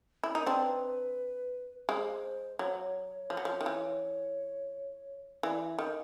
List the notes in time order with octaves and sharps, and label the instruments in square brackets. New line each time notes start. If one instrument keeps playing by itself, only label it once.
[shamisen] E4
[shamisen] D#4 [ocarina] A#4
[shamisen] C4 D4 [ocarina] B4 C5
[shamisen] G#3 [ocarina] C5
[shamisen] F#3 [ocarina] C#5
[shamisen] F3
F#3
F3
D#3
E3
[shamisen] E3 [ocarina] D5
[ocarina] E5
[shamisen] D#3 [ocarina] D#5